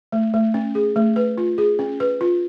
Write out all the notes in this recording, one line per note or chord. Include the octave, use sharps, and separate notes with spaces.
A3
A3
C#4
G#4
A3
B4
F4
G#4
C#4
B4
F4